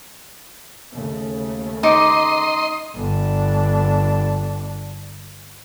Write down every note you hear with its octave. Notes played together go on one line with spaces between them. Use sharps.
D#2 C#3 A3
D#4 D#5 C6 D6
G1 D4